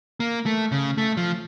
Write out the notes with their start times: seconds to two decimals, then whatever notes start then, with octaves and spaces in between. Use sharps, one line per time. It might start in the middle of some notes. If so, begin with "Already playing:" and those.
0.20 A#3
0.46 A3
0.72 C#3
0.98 A3
1.17 F3